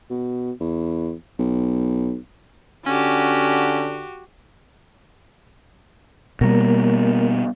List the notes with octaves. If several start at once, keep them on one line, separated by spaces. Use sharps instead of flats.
B2
E2
B1
D3 C#4 F#4 G4
B2 G3 A#3 A#4